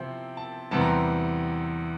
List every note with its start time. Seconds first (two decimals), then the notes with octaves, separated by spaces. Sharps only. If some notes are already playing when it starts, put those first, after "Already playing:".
Already playing: C3 F3 C4 E4 G5
0.37 A5
0.71 E2 C3 E3 G3 C4 A5
0.81 A#5
0.89 C6